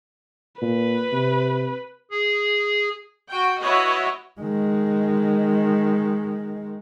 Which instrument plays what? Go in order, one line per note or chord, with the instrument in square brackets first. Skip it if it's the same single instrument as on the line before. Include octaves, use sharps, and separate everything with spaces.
[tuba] A#2 [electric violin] B4
[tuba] C3
[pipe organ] G#4
[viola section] F#4 G5
E4 F#4 B4 C#5 D#5
[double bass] D#3 G#3